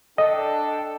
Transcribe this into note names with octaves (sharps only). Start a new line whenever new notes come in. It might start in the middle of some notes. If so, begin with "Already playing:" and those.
D4 A4 D#5 G5